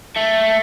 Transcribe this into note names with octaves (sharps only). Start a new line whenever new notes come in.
A3